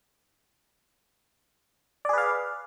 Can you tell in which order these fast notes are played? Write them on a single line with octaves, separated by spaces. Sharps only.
D5 G#4 B4 F5